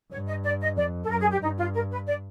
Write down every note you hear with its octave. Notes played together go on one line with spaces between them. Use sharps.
G2 C#5
D#5
D5
D#5
F2 D5
A4
F#2 A#4
G#4
G4
G2 D#4
F4
A#4
B4
D5